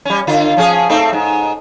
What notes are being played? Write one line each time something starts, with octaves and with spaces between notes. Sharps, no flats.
G3 C#4
D3 F4
F3 C#4 G#4
A3 C4 D#4
G#2